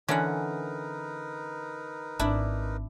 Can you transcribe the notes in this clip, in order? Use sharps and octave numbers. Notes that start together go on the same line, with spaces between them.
D3 E3 C#4 D#4 A#4 B4 F#5
G#1 D4 E4